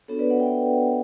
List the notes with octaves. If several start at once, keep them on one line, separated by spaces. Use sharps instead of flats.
B3 D4 F#4 A4 C#5
B4 D5
D5 F#5
E5 G5